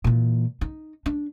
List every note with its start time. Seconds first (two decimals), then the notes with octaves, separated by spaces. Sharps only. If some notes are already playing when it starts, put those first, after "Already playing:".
0.04 A#2 E3
0.61 D#4
1.06 D4